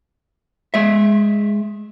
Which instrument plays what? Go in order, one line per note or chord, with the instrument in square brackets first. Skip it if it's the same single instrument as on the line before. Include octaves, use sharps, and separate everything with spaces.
[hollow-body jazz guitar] G#3 E5